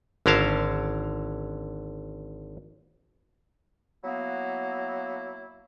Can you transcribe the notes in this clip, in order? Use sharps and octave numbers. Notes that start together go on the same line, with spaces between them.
G#1 D3 C#4 A#4 F5 A5
F#3 A#3 B3 E4